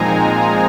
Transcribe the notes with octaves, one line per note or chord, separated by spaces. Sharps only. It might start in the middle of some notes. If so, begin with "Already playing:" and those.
Already playing: A#2 F3 G#3 C4 D#4 G#5 A#5